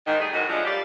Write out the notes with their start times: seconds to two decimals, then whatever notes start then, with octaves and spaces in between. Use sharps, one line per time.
0.06 G#2 D#3
0.20 G3 A3 D#4 G#4
0.33 E2 G#2 B2 D#3 F#3 F#4
0.49 C#3 F3 F#3 G#3 A3 D4
0.65 F#2 G3 G4 D5 F5